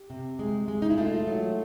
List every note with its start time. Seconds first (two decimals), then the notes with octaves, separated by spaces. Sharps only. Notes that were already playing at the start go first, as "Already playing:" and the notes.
Already playing: G4
0.10 C3
0.39 G#3
0.68 G#3
0.82 D#4
0.90 E4
0.98 A3 F4
1.27 F#3